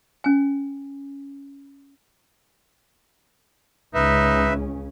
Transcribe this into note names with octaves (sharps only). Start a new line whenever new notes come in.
C#4 G#5
C#2 C#3 C#4 D#4 B4 E5